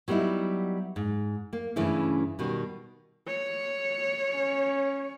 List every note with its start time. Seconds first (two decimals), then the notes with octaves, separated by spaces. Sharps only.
0.08 F#3 G3 B3 D#4 E4
0.96 G#2
1.53 A#3
1.76 G2 C#3 E3 A3 C#4 E4
2.39 B2 D#3 G3
3.28 C#5
4.35 C#4